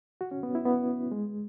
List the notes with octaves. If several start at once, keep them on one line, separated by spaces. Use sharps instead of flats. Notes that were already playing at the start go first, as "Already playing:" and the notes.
F#4
C#4
B3
E4
B3
G#3